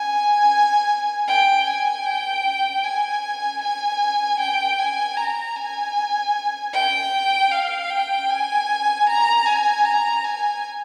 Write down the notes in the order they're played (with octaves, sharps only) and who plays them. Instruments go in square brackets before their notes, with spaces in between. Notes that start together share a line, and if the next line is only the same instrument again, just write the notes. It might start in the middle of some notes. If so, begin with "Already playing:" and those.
Already playing: [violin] G#5
G5
G#5
G5
G#5
G#5
G5
G#5
A#5
G#5
G5
F5
G5
G#5
A#5
G#5
A#5
G#5